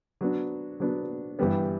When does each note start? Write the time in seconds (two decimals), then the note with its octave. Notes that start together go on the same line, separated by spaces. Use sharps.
0.21 F#3 B3 D4
0.80 F#3 B3 D4
1.39 G2 E3 G3 B3